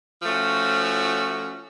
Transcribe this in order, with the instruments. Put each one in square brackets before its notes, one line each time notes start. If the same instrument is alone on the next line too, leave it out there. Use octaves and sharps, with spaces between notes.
[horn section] F3 A3 C#4 F#4